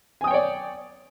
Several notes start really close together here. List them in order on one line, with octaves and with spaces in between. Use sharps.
G#5 D#6 G5 C#5 D5